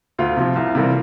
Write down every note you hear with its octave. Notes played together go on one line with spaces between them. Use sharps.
D2 F4
C3 F3
C2
C3 E3 G3 A#3